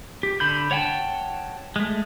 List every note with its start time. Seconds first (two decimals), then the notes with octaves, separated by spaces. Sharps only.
0.23 G4
0.40 D3 B5 G6
0.71 C#5 F#5 G5 A5
1.76 G#3 A3